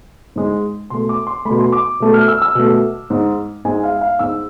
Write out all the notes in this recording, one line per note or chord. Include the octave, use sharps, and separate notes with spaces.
G#2 G#3
B2 A3 C6
D6
C6
A3 B5
B2
C6
D6
B2 A3
F6
E6
E6
B2 A3
G#2 G#3
G#2 G#3 G#5
F5
F5
G#2 G#3 E6